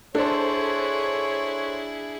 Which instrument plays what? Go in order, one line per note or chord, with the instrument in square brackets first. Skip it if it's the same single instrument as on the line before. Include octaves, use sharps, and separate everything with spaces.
[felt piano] D4 [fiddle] E4 G#4 [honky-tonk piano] A4 C5 [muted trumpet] C#5